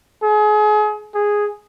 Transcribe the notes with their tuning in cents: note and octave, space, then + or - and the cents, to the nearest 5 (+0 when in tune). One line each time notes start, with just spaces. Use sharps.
G#4 +30
G#4 -5